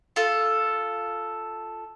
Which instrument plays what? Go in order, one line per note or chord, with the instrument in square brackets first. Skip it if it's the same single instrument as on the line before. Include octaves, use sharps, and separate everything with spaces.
[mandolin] F4 A4